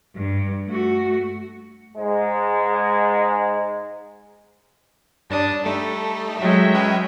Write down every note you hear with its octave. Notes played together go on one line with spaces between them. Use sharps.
G2
A3 F#4
G#2 G#3
G2 D4 A5 D#6
G3 A3 D#4 A4
F#3 G#3 E5 G5
C#4 B4